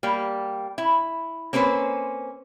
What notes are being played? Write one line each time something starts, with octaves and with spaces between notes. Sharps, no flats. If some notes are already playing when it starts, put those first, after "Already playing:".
G3 A#3
E4
A#3 C4 C#4 B4 C5